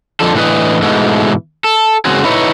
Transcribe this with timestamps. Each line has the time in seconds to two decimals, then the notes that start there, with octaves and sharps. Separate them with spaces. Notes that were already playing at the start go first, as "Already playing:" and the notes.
0.20 F2 D3 F3 A4
0.35 A2 D3 E3 B4 D#5
0.82 G#2 B2 E3 G#3 A3
1.64 A4
2.05 F#2 C#3 G#3 C4 F#4 G#4
2.24 D#4 E4 B4 C#5